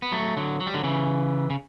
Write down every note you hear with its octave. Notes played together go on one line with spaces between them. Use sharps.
B3
F#3 A3
D3 F#3
F#3
G3
D3 F#3
C#3 E3
C#3